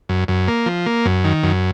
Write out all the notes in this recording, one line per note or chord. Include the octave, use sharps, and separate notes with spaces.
F#2
F#2
A#3
F3
A#3
F#2
D#3
F#2